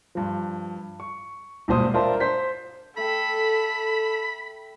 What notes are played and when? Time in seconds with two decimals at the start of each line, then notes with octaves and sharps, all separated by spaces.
0.15 G2 F3
1.00 C#6
1.68 E1 G2 A#2 C5 D#6
1.94 D4 F4 A#4 C5 E5 A5
2.20 C5 G6 B6
2.97 A3 A4 G5 B5